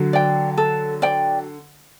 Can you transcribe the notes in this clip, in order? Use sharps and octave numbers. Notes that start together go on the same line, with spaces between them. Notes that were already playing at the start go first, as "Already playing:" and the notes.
Already playing: D3 F#3
D5 G5
A4
D5 G5